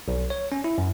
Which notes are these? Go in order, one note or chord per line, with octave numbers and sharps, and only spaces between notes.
B1
C#5
C#4
E4
F#2